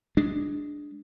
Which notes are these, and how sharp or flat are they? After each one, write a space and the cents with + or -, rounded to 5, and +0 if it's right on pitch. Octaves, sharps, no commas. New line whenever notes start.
G#3 +0 D4 +0